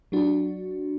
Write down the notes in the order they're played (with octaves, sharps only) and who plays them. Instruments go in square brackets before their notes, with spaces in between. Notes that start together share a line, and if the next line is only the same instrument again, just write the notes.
[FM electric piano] F#3 D4 F#4